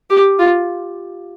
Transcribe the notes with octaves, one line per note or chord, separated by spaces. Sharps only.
G4
F4